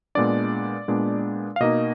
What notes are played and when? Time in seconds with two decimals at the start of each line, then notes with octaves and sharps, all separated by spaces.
0.15 A#2 G#3 B3 D4 D5
0.88 A#2 G#3 B3 D4
1.56 F5
1.60 B2 A#3 D#4 D#5